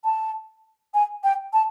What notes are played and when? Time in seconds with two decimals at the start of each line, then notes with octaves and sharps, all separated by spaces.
0.04 A5
0.94 G#5
1.24 G5
1.53 A5